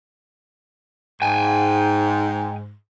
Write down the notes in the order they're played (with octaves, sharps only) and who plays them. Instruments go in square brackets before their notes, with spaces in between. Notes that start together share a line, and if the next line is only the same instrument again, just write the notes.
[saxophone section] G#2 [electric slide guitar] G5 G#5